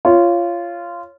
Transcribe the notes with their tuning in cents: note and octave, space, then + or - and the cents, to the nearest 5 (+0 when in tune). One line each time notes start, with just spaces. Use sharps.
F4 -15 C#5 +0